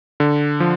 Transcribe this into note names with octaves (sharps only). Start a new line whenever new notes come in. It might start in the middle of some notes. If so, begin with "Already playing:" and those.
D3
F3